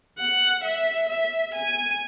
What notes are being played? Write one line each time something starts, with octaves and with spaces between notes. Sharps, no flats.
F#5
E5
E5
G#5